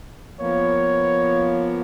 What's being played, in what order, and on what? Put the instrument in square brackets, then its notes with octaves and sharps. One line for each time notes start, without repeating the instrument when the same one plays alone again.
[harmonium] F3 A#3 B3 [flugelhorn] C#5